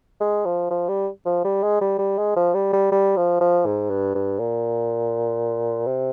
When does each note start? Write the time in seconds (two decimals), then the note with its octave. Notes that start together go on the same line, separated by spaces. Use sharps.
0.21 G#3
0.45 F3
0.71 F3
0.89 G3
1.25 F3
1.44 G3
1.63 G#3
1.81 G3
1.99 G3
2.18 G#3
2.36 F3
2.54 G3
2.73 G3
2.92 G3
3.17 F3
3.40 F3
3.66 G#2
3.90 G2
4.15 G2
4.39 A#2
5.87 C3